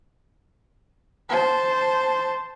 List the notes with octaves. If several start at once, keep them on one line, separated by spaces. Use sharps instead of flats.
C5 A5